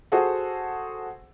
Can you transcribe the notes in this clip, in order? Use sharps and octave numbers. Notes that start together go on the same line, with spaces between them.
F#4 G#4 A4 C5 F#5